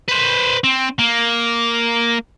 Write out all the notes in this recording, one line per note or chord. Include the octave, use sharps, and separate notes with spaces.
B4 C5
C4
A#3